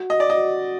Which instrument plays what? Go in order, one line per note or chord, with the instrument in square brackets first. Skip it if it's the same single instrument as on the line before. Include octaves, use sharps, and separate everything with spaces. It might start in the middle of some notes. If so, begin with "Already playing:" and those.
Already playing: [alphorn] F#4
[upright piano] D#5
D5
[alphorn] F#4 [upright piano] D#5